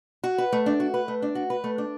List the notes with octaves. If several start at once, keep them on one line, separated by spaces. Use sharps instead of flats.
F#4
B4
A3
D4
F#4
B4
A3
D4
F#4
B4
A3
D4